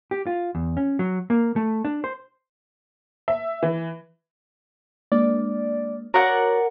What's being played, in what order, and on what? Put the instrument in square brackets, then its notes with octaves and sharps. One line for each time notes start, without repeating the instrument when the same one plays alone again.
[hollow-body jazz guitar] G4
F4
E2
C#4
F#3
A#3
A3
D4
C5
[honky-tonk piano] E5
E3
[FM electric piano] G#3 A#3 D4 [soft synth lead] D5
[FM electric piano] F#4 [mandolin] A#4 D5 F#5 [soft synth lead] C#5